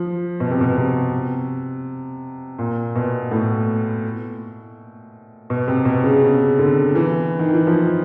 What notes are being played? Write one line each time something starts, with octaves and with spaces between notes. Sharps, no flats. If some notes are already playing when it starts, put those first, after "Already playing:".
Already playing: F3
B2
C3
B2
C3
A#2
B2
A2
B2
C3
B2
C#3
C#3
D3
E3
D#3
E3
F3